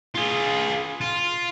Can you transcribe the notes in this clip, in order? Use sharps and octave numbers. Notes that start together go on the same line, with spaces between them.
F4 G#4
F4